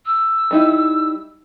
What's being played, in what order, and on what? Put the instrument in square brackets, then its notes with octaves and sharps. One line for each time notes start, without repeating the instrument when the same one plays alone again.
[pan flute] E6
[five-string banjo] G3 D#4 E4